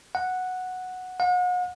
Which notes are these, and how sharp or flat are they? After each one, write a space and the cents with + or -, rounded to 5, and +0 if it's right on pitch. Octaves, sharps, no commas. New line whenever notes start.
F#5 -5
F#5 -40